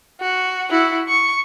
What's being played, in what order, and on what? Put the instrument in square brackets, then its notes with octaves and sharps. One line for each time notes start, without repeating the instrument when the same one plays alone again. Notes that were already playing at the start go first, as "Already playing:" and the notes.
[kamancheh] F#4
E4 F#4
C#6